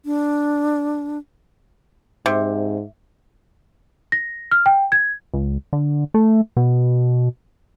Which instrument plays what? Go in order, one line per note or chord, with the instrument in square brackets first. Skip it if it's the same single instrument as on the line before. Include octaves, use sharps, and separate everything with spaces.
[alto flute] D4
[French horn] G#2 [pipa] C3
[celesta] A#6
F6
G5
G#6
[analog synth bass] C#2
D3
A3
B2